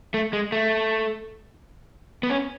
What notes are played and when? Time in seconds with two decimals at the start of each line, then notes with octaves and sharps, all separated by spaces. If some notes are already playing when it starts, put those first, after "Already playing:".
0.14 A3
0.33 G#3
0.52 A3
2.23 B3
2.30 C#4